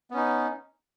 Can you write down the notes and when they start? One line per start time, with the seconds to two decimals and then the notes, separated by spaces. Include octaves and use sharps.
0.11 B3
0.14 C#4
0.17 D#4